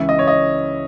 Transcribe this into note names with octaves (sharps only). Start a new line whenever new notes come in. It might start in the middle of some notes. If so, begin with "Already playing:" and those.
Already playing: C#2 C#3 E3 E5
D#5
C#5
D#5